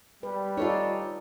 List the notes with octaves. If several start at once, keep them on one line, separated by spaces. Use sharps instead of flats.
G3 B4
D#4 F4 A4 C#5 D5